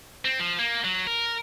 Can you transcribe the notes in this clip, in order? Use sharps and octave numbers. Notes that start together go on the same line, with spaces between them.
C4
F3
A#3
F#3
A#4